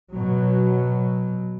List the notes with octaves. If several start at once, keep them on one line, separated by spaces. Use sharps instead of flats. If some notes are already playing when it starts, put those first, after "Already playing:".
B2 F#3